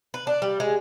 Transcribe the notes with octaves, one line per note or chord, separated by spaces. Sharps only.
B4
D4
G3
G#3